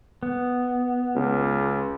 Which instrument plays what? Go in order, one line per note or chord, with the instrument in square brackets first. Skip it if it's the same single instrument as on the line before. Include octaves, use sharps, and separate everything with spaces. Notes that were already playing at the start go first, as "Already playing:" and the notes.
[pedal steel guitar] B3
[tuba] C#2